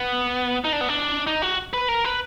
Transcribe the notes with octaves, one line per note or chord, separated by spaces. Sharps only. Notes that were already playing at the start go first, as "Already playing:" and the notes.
Already playing: B3
D#4
D4
B3
D4
D#4
F#4
B4
A#4
B4